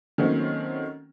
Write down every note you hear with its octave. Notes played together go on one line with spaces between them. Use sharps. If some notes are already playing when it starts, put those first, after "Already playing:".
D#3 F#3 A3 A#3 C4 C#4